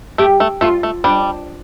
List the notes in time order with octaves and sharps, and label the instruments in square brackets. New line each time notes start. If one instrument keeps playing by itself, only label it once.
[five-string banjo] A3 [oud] G4
[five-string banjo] A3
[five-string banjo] A3 [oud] F4
[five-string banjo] A3
[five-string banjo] G3 [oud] D4